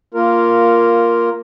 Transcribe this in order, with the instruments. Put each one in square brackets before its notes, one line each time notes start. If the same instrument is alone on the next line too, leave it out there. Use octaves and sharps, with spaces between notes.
[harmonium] A#3 F4 A#4